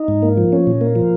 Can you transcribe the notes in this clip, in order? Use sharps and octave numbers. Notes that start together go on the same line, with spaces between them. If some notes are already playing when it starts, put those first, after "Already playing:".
Already playing: D#4
G#2
A#3
F3
C#4
A#2
A#3
F3